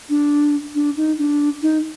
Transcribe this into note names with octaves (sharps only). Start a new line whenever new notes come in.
D4
D4
D#4
D4
D#4